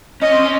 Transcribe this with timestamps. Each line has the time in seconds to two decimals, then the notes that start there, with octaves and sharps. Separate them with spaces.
0.22 C#4 D#5
0.32 C4
0.43 C#4